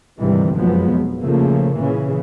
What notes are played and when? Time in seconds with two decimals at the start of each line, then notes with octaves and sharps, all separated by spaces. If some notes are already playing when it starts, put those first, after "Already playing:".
0.21 G#1 D2 C3 D#3 E3 G3
0.54 F1 F#2 F3 F#3 G#3 B3
0.90 B2
1.22 A#1 C#3 F3 A3 A#3
1.76 A#2 C#3 E3